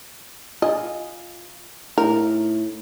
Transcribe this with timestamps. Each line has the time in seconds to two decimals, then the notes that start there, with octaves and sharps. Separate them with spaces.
0.62 F4 D#5 G#5
1.98 A2 D#4 A#4